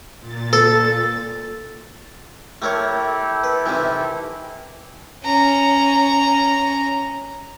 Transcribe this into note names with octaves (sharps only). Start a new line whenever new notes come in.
A#2 A6
A4
A3 E4 G4 A4 A#4 C#5
B4
C3 D#3 E3
C#4 A#5